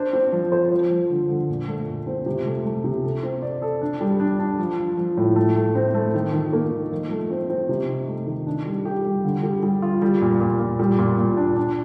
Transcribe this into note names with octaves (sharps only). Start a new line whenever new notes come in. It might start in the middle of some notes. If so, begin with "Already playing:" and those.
Already playing: D4 C5
C4
F3
C5
F3
F3
D3
D3
A#2
A3
A#2
C4
C3
A3
A3
C3
A4
C4
D5
A4
D4
G3
D4
D4
F3
F3
F3
A2
A3
A3
C4
A3
D#3
D#3
A#3
D#3
F3
A3
C4
C4
C3
D#4
A3
D#3
D4
G3
G4
G3
D3
G3
G3
F4
G3
A#2
A#2
A#2
G3
A#2
A#2
D4
D4